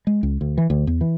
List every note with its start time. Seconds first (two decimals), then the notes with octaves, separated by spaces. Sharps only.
0.07 G#3
0.23 C#2
0.41 D2
0.58 E3
0.70 D2
0.87 E2
1.01 E3